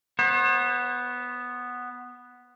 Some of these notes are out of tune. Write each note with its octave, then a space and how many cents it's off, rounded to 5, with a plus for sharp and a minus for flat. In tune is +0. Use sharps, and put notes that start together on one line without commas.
B3 +0 C5 +45